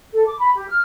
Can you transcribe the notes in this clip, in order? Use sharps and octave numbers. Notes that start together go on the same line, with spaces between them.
A4
D6
B5
G4
F6